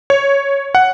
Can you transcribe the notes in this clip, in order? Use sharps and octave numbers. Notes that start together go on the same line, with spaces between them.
C#5
F#5